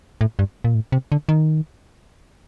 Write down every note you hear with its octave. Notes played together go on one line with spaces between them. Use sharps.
A2
G2
A#2
A2
C3
D3
D#3